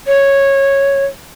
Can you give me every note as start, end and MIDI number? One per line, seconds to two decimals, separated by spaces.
0.07 1.05 73